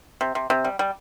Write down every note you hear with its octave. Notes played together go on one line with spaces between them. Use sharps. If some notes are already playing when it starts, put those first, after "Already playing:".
C3
C3
C3
G3
G3